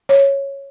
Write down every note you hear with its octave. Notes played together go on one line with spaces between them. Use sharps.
C#5